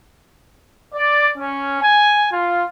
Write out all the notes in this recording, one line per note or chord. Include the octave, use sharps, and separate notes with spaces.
D5
C#4
G#5
F4